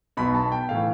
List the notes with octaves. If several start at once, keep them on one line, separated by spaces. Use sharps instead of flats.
B1 B2 B5
A5
G5
A2 E3 F5